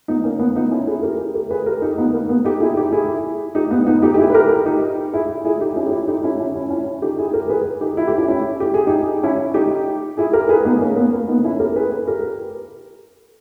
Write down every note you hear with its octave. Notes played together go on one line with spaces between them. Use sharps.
B3 D#4
A#3 C#4
B3
B3 D#4
C#4 E4
E4 G#4
G4 A#4
G4 A#4
G#4 B4
G4 A#4
D#4 G4
B3 D#4
A#3
B3
D#4 G4
E4 G#4
D#4 G4
E4 G#4
D#4 G4
B3 D#4
B3 D#4
D#4 G4
G4
E4 G#4
B4
G4 A#4
D#4 G4
E4 G#4
E4 G#4
D#4 G4
C#4 E4
G4
C#4 E4
D#4 G4
C#4 E4
C#4 E4
C#4 E4
C#4 E4
D#4 G4
E4 G#4
G4 A#4
G#4 B4
D#4 G4
E4
G4
C#4 E4
C#4 E4
G4
G#4
D#4 G4
C#4 E4
D#4 G4
E4 G#4
G4 A#4
G#4 B4
B3 D#4
A#3 C#4
B3
A#3
B3 D#4
C#4 E4
G4 A#4
G#4 B4
G4 A#4